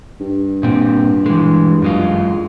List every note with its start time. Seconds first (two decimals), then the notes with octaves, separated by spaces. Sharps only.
0.21 G2
0.63 A#2 C4
1.26 E3 G#3
1.82 F#2 G#3 F4